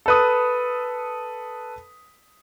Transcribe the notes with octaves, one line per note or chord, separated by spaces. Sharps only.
A4 B4 D#6